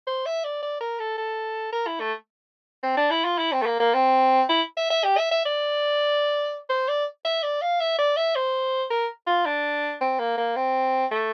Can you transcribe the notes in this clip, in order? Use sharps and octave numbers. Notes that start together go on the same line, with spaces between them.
C5
E5
D5
D5
A#4
A4
A4
A#4
E4
A3
C4
D4
E4
F4
E4
C4
A3
A#3
A#3
C4
E4
E5
E5
G4
E5
E5
D5
C5
D5
E5
D5
F5
E5
D5
E5
C5
A#4
F4
D4
C4
A#3
A#3
C4
A3